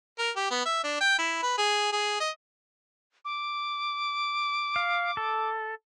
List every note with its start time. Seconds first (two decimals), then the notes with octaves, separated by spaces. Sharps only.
0.19 A#4
0.36 G4
0.51 B3
0.66 E5
0.84 D4
1.01 G5
1.18 E4
1.43 B4
1.58 G#4
1.93 G#4
2.20 D#5
3.25 D6
4.76 F5
5.17 A4